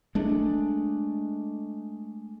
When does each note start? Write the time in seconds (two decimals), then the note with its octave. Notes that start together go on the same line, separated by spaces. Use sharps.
0.15 G#3 A3 D4